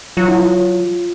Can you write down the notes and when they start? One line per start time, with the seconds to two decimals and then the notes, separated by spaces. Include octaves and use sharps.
0.17 F#3 F4
0.28 E4
0.39 F4